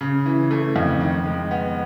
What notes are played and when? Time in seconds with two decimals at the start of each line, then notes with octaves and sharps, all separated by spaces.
0.01 C#3
0.26 E3
0.51 A3
0.76 F2
1.01 D#3
1.26 G#3
1.51 B3